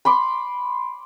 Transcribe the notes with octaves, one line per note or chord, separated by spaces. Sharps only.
B5 C6 D6